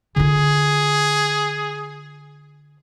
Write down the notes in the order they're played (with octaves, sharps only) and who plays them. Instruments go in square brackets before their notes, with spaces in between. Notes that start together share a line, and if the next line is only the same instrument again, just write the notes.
[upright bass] D3 F4 [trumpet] G#4